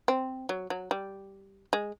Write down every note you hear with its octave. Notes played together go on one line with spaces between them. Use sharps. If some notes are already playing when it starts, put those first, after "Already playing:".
C4
F#3
F#3
G3
G#3